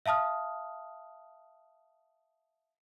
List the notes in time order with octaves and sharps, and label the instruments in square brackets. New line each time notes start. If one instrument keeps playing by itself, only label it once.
[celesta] E5 F5 A5 D#6 F6